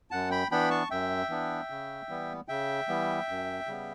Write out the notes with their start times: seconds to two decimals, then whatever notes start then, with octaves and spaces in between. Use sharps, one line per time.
0.11 F#2 F#5 A5
0.31 G5 B5
0.51 E3 B3 D4 G5 B5
0.70 A5 C#6
0.91 F#2 E5 G5
1.30 E3 B3 D4
1.70 C#3
2.09 E3 G3 B3
2.48 C#3 E5 G5
2.88 E3 G3 B3
3.28 F#2
3.67 C#3 G3 B3